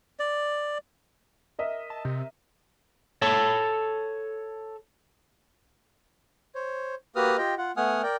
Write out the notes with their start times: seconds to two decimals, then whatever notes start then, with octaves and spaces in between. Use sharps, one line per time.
0.19 D5
1.59 A#4 D#5 E5
1.90 A5
2.05 C3
3.22 A4 C#5 A5
6.55 C5 C#5
7.16 A#3 F#4 G4 B4 D#6 F6
7.38 F4 G4 D#5 G5
7.58 F4 F#5
7.77 A3 B3 F#5 G#5 D#6 F6
8.03 A#4 D5 G5